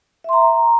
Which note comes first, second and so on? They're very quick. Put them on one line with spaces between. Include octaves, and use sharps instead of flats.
E5 C6 A#5